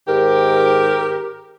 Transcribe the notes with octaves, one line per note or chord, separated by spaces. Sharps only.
G#2 D#3 G4 A#4